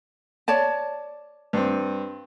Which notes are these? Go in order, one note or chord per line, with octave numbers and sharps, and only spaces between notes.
C#5 D5 A5
G2 C4